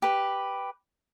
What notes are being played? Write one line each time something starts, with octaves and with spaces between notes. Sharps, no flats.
G4 B4